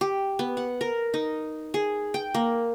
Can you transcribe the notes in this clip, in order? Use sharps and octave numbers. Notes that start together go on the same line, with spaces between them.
G4
B3
F#5
A#4
D#4
G#4
G5
A#3